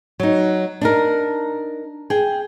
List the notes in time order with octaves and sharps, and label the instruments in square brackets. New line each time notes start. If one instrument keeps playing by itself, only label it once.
[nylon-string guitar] F#3 D#4
D4 D#4 A#4
G#4 G5